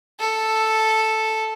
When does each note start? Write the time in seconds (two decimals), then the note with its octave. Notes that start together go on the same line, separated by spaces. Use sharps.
0.20 A4